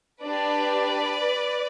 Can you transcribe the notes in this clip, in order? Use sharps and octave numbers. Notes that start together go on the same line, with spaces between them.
D4 G4 B4 D5